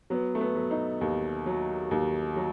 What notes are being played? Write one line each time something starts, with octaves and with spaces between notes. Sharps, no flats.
F#3 B3
A3
B3
F#3
D#4
D#2
F#3
D#2
F#3